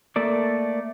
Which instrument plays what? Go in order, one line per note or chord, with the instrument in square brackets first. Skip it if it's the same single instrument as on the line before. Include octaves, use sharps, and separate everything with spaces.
[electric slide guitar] A3 A#3 A4 D5